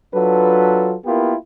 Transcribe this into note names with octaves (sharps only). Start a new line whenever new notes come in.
F#3 D4 F4 A4 B4
A#3 B3 E4 F4 G4 A#4